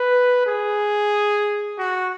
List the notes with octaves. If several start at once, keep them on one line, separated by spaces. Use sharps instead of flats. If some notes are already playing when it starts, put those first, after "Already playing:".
Already playing: B4
G#4
F#4